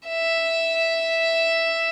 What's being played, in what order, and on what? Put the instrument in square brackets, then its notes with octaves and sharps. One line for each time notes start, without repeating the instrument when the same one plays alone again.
[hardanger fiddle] E5